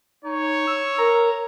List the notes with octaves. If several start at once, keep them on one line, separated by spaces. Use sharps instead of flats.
D#4 C#5
E6
A#4 A#5